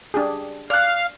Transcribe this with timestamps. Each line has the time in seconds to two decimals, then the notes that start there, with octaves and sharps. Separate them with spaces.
0.14 D4 G4 G#4
0.70 D5 F5 F6 F#6